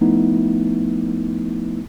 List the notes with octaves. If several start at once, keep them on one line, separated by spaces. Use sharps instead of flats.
F3 A3 B3 D#4 E4